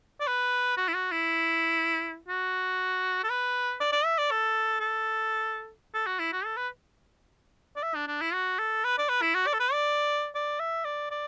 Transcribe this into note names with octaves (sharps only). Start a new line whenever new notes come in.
D5
B4
F#4
E4
F#4
E4
F#4
A4
B4
D5
D5
E5
D5
A4
A4
A4
F#4
E4
F#4
A4
B4
D5
E5
D4
D4
E4
F#4
A4
B4
D5
B4
E4
F#4
D5
A4
B4
D5
D5
E5
D5
D5